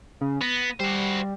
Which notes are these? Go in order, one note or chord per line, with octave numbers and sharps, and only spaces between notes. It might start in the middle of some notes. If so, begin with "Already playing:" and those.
C#3
B3 A#6
G3 F#4 C5